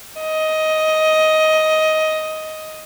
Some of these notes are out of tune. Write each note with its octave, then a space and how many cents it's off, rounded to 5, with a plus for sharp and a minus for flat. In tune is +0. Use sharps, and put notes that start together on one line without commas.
D#5 +10